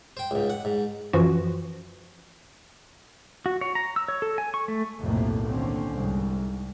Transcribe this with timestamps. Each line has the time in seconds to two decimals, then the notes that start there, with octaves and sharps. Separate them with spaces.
0.17 C5 G5
0.31 C#2 G#2
0.50 F#5
0.65 G#2
1.13 F#2 E3 F3 F4 F#4
3.46 F#4
3.61 C#5
3.75 A#5
3.96 E6
4.08 C#5
4.22 A4
4.38 G#5
4.54 C#6
4.68 A3
5.01 B1 F2 A2 C3 A3 A#3
5.44 D#2 D3 C4 C#4
5.93 C2 G#2